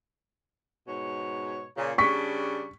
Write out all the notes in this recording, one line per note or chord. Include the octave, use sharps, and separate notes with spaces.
G#2 B2 C#5
A#2 C#3
C#3 G3 D4 C#6 B6